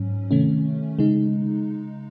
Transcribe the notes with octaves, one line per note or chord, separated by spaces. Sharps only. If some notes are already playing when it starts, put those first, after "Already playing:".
Already playing: G#2 F#3 C#4
C3 D#3 A3 C#4
C#3 G#3 D#4